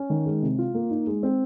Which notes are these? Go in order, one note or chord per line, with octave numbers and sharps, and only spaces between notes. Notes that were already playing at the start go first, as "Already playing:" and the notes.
Already playing: C#4
D#3
G#3
C3
F4
A#3
D#4
G#3
C4